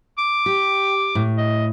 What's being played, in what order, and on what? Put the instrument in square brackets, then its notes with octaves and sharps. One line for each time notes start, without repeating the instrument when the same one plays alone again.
[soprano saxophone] D6
[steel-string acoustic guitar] G4
A2
[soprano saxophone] D#5